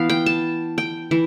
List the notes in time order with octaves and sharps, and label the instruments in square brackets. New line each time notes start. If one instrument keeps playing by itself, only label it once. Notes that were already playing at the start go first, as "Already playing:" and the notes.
Already playing: [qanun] E3 B3 F5
G5
A5
G5
E3